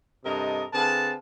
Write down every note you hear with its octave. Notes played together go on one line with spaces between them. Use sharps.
G2 C3 A4 A#4 D#5
D3 C4 G#4 B4 F5 A5